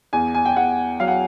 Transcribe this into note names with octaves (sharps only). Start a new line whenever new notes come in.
E2 G#5
G#5
G5
E2 F#5
F#3 F5
F#5